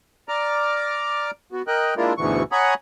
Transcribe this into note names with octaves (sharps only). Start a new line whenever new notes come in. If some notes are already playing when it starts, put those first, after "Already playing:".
D5 A#5 D6 F6
B3 F#4
A#4 D#5 G5 F#6
G#3 A#3 D4 E4 F4 A#4
D2 G#2 B2 D3 E3 C#6
C#5 F#5 G#5 A#5 B5 D#6